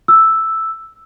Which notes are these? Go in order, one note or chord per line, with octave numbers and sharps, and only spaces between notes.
E6